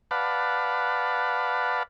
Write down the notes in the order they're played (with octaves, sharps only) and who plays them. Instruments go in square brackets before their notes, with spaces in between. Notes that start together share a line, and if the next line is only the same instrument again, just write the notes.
[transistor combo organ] B4 D5 F5 F#5 A5 B5